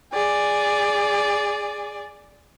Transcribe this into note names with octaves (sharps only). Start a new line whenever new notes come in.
G#4 D5